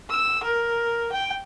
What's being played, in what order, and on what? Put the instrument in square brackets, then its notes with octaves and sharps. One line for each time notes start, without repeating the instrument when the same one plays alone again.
[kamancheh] E6
A#4
G5